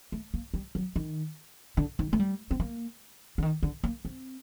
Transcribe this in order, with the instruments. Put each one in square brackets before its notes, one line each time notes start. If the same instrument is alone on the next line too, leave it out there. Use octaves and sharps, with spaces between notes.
[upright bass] A3
A#3
G3
F#3
D#3
D3
D#3
A3
G3
C4
A#3
D3
D#3
D3
A#3
C4